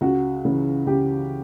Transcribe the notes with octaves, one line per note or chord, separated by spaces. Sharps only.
C#2 F#4
C#3 E3
C#2 G4